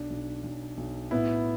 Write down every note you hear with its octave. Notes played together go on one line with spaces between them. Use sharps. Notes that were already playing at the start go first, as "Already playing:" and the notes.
Already playing: B1 D4
B1
B1
B1
A2 B3 E4